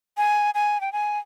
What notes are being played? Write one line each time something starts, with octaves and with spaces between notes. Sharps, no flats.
G#5
G#5
G5
G#5